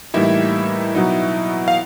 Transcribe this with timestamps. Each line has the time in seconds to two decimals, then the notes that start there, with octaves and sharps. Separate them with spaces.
0.14 A2 E3 G3 A#3 D#4 E4 E5
0.95 B2 F#3 B3 D#4
1.68 F5